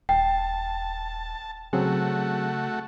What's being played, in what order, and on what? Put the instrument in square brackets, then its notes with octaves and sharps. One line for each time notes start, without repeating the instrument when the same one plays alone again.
[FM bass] D#1 [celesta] G5 [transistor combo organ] A5
[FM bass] C#3 [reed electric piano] F#3 C4 G#4 [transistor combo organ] A3 F#4